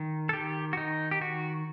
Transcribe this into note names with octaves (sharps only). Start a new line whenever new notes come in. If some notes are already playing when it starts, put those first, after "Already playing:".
Already playing: D#3
A4
D#3 G4
F#4
D#3 D#4
G4
D#3 F#4